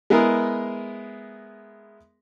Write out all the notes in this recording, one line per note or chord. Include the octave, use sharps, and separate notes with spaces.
G#3 B3 E4 G#4 A#4